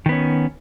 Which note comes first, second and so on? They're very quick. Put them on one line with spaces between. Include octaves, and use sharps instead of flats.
D#3 B3 C#4